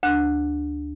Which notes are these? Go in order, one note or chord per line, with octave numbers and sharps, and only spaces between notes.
D2 D4 F#6